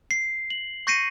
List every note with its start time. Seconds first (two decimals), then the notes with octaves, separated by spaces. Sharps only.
0.11 C7
0.50 F#7
0.87 C#6 G6 A#6 C7 C#7 D#7